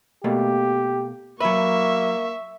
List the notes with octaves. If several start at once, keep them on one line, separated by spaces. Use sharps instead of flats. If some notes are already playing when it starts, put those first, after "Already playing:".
B2 A3 A#3 G4
F#3 A#3 B4 E5 C#6